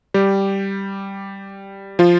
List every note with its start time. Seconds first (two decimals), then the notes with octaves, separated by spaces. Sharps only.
0.14 G3 G4
1.99 F3 F4